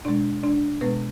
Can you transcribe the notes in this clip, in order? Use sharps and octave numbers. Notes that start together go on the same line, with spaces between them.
B2 G#3 D4 D5
D4 D5
B2 G#3 B3 B4